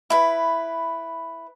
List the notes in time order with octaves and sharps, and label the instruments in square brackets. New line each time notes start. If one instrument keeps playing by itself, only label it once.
[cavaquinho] E4 B4